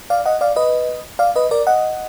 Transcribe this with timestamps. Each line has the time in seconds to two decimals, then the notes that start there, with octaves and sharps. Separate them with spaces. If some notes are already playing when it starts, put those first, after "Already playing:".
0.10 D5 F5
0.26 D#5 F#5
0.41 D5 F5
0.56 B4 D#5
1.19 D5 F5
1.36 B4 D#5
1.51 A#4 D5
1.67 D#5 F#5